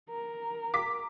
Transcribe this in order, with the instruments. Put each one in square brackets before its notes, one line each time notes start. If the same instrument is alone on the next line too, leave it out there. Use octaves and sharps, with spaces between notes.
[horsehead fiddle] A#4
[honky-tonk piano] D6 B6